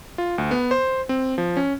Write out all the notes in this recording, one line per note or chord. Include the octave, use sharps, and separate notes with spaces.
F4
D2
B3
C5
C4
F3
C#4